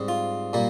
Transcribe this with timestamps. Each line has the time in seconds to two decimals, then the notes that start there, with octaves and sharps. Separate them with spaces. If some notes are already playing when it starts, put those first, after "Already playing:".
Already playing: G#2 G3 C4
0.08 F4
0.53 A#2 G3 A#3